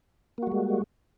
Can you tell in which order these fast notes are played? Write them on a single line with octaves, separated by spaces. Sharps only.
A#3 F#4 G3 G#3